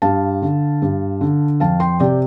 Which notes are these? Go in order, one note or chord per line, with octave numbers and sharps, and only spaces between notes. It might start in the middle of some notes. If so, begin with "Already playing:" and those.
G2 F5 A5
D3
G2
D3
F2 F5 A5
G5 C6
C3 D5 G5